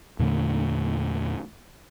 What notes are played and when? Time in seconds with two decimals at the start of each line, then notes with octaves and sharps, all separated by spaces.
0.19 E2 A#2 D3 A3